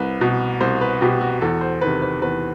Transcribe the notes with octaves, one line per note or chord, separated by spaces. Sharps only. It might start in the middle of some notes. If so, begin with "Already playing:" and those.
Already playing: C2 B4
B2
C2 C5
B4
B2 G4
F#4
E2 A4
C5
C3 D#3 B4
B4
E2 B4